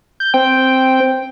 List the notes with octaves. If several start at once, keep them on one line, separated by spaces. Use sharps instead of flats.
G6
C4 G5